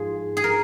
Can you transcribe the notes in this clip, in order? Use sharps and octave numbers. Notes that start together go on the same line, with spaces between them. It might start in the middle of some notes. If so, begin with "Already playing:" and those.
Already playing: G#2 F3 G#4
G#4
A#4